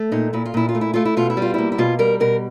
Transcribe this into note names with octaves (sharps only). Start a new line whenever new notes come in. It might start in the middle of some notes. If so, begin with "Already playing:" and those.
Already playing: A3
A#2 D#4
A#2 E4
F4
A#2 E4
F4
A3
E4
A3 F4
E4
B2 F4
E4
G3 F4
A#3 E4
E4
B2 F4
G3 A#4
B2 A#4